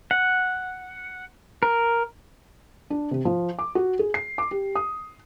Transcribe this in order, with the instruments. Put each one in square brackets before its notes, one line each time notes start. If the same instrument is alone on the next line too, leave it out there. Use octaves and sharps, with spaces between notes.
[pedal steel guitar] F#5
A#4
[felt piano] D4
C3
F3
D6
F#4
G#4
C7
D6
G4
D#6